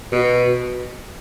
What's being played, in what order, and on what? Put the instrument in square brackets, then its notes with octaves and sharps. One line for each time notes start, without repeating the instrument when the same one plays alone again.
[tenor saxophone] B2